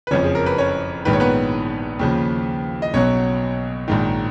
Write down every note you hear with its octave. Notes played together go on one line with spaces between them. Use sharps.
B4
F#1 F2 F3 C#4 C#5
G#4
A#4
B4
C#4 C#5
A#1 G#2 D#3 B4
C#5
B3 B4
D#2 C#3 F3
D#5
B1 B2 F#3 C#4 C#5
A#1 G#2 D#3